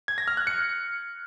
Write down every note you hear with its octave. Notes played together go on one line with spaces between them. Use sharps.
G#6
A#6
F6
F#6
C#7